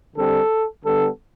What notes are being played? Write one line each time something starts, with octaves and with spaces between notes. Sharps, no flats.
D3 G3 C4 A4
D3 G3 B3 A4